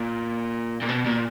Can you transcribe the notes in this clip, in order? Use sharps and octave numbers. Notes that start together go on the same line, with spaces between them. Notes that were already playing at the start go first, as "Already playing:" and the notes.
Already playing: A#2
A#2
B2
A#2